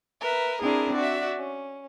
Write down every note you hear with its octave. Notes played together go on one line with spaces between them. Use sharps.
A#4 B4 E5
C4 D4 E4 G#4 A#4
F#4 D5 E5
C#4